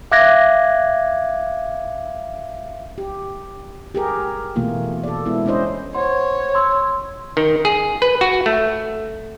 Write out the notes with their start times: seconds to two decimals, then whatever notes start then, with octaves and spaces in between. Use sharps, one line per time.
0.12 E5 F5 D6 F#6 G#6 A#6
2.98 G4
3.95 G4 G#4 A#4
4.56 B2 E3 A3 A#3 F4
5.04 A4 D5
5.26 G#3 B3 E4
5.46 C#4 D4 E4 C5 D#5
5.95 C5 C#5 F#5 C6
6.55 C6 E6
7.37 D#3
7.65 G#4
8.02 B4
8.21 F#4
8.46 A3